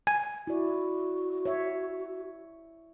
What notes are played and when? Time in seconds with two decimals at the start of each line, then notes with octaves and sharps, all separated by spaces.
0.07 G#5
0.47 E4 F#4 D5
1.45 C#5 E5